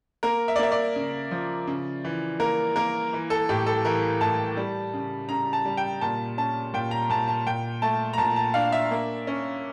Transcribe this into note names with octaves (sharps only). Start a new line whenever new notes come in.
A#3 A#4
E5
D5
A#3 E5
D5
C#3
F3
C#3
E3
A#3 A#4
A#3 A#4
E3
A4
A2 G4
A4
E3 A#4
A2 A5
G3
C#3
C#3 A#5
A5
G3
G5
A#2 A5
C#4 A5
A#2 G5
A#5
A#2 A5
A5
A#2 G5
A3 A5
A#5
A#2 A5
A5
D4 F5
E5
A#3
C#4